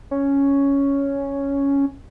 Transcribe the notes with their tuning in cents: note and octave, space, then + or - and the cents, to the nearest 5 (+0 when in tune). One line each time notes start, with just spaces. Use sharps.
C#4 +5